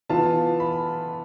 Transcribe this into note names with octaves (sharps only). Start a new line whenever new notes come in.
E3 B3 F4 A5
B5